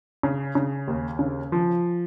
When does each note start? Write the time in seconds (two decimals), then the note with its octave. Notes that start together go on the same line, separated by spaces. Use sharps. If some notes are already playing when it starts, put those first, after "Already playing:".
0.23 C#3
0.55 C#3
0.87 D#2
1.19 C#3
1.52 F3